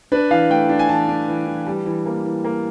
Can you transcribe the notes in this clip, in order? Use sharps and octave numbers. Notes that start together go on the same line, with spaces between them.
D4 B4
E3 F5
A3 G5
D4
G#5
E3 A5
D4
E3
E3
G3
E3
A#3
E3
A#3